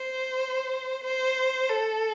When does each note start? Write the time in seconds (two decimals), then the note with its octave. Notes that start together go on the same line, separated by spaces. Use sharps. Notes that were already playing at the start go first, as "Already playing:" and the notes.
Already playing: C5
1.04 C5
1.69 A4